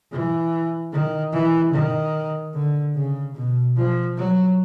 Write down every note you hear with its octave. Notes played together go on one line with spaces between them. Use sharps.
E3
D#3
E3
D#3
D3
C#3
B2
F3
F#3